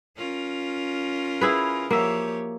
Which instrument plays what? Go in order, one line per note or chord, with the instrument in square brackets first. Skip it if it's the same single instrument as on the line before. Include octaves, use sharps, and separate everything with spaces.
[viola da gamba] C#4 F4 A#4
[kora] E4 G#4 B4
[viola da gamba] F3 G4 C#5 [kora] A#3 E5